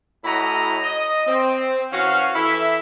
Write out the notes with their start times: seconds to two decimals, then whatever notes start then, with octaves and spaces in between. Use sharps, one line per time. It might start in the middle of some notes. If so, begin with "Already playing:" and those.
0.24 A2 E4 F#4 D#5 A#5
0.83 D#5
1.27 C4
1.92 E3 C#4 F#4 F5
2.35 E3 E4 A4 E5